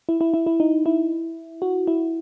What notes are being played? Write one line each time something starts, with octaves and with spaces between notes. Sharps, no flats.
E4
E4
E4
E4
D#4
E4
F#4
E4